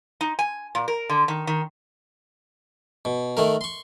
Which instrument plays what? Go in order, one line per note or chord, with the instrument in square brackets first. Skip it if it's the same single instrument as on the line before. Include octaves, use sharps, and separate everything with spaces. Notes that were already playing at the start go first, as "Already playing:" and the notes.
[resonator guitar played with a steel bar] D#4
G#5
A#2
A#4
D3
D#3
D#3
[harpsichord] B2
D#3 A3 A#4
C6 C#6